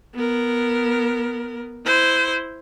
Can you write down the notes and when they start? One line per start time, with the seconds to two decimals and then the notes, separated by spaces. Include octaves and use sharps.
0.14 B3 A#4
1.85 E4 C5